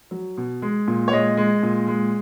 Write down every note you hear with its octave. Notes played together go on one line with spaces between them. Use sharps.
F#3
B2
G#3
A#2
C#5
G#3 D#5
G#3
A#2
G#3